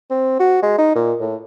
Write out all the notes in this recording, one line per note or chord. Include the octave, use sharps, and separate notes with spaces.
C4
F#4
G#3
D#4
A#2
A2